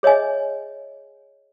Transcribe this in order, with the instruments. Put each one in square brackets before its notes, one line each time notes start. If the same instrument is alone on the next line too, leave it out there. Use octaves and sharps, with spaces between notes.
[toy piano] G#4 C#5 D#5 E5 G#5